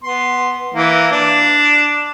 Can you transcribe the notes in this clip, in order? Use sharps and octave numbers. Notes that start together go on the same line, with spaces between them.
B3 C6
E3 A#3
D4